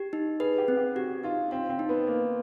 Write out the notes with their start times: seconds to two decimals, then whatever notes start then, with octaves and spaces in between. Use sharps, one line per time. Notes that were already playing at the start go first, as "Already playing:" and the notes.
Already playing: G4
0.13 D#4
0.40 G#4 B4
0.58 G4
0.68 C4
0.77 G4
0.95 F#4 G4
1.23 D#4 F4
1.51 C4 F5
1.69 C4
1.79 D#4
1.89 B3
2.07 A#3 C5